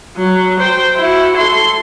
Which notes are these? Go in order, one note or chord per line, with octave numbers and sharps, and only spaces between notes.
F#3
C5 G5
E4 F#4
A4 C6